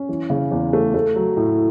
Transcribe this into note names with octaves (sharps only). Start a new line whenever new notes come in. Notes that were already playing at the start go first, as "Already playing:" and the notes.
Already playing: C#4
E3
C#3
E2
A3
A3
F#3
A2